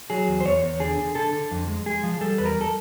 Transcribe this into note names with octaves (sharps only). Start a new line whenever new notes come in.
F#3 G#4
E2
C5
E2 C#5
E2
D3 G#4
D3
D3 A4
D3
F2
G#3
G#3 G#4
F3
G3 A4
E2 B4
A#4
A4